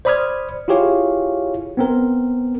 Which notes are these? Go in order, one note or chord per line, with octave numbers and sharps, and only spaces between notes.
C5 D5 B5 D#6 F6 G#6
E4 F4 G4 G#4 C#5 F5
B3 C4 A#4